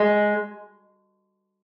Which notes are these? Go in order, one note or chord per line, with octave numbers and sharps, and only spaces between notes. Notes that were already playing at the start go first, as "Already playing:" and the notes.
Already playing: G#3